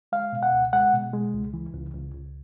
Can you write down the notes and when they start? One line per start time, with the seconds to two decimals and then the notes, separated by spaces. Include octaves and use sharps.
0.12 G#3 F5
0.33 B2
0.43 F#5
0.53 C#2
0.73 G#3 F#5
0.93 B2
1.13 G#3
1.34 C#2
1.54 E3
1.74 C#2
1.94 C#2
2.14 C#2